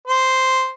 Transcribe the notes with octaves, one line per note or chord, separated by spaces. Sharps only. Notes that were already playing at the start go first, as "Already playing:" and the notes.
C5